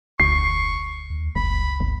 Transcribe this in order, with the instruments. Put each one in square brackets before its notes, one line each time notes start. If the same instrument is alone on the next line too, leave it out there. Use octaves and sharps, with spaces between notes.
[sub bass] F1 [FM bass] D2 [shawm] C#6 [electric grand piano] C7
[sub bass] D#2
[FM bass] F#1 [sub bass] C#2 [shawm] B5
[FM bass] G1